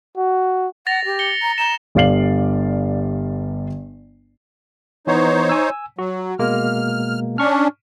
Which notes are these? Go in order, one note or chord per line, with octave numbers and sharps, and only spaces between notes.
F#4
F#5 A6 A#6 F7
G4
C#7 G7
A#5
A#5 E7 G7
G1 G2 D5 F5 C7 F#7
E3 B3 D#4 C5 C#5
G#5 E6
F#3 F#4
B2 G#3 A#3 F6
C#4 D4 C#6 F6